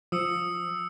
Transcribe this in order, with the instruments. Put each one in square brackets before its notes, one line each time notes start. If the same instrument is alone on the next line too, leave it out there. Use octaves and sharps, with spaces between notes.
[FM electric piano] F3 [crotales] D#6 E6 C#7